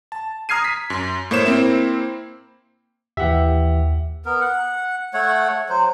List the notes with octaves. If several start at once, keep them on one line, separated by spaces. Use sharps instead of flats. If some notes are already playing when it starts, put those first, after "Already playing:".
A5
A#5 D#6 F6 G#6 C7 D#7
B6
F#2
A2 A#3 C5 C#5 E7
A#3 C4 E4
D#2 E3 G4 E5 F#5
B3 A#4
F#5
A3 C#5 F#5
F#3 C5